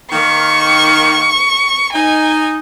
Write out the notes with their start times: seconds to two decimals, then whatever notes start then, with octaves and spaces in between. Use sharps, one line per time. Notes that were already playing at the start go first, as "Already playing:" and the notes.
0.12 D#3 A#3 C#6
1.93 D#4 G#5